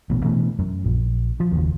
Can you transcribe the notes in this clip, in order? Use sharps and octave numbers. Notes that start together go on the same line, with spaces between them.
A1 B2
B2 E3 A3
F#2
A#1
F3
F#1 D#2